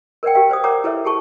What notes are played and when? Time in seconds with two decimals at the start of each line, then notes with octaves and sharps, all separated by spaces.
0.23 A#4 B4 D5 F#5 G5
0.34 G4 A#4 F5 G5
0.50 B4 C5 D5 D#6
0.64 A#4 C#5 D5 F#5 A#5 D6
0.84 E4 A4 B4 C#5 E5
1.05 G4 G#4 A5 C#6